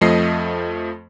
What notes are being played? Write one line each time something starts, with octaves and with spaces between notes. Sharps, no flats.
F2 F3 A3 D#5 C7